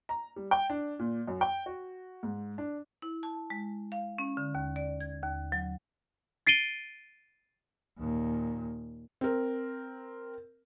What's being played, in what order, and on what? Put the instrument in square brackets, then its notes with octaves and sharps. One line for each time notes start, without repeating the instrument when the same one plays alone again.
[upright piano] A#5
G3
G5
D4
A#2
F#2
G5
F#4
G#2
D4
[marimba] E4
A5
G#3
F5
C#4
D3
D#2
D5
G#6
D#2
F#3
[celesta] A6 C7 D7 D#7 G7
[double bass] D#2 A#2
[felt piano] C4 A#4